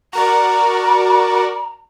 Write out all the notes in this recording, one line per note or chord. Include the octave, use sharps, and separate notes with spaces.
F#4 A#4 D5 A#5